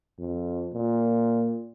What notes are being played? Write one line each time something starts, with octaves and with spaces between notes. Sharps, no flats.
F2
A#2